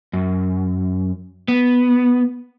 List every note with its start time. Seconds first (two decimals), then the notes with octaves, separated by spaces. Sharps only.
0.13 F#2
1.48 B3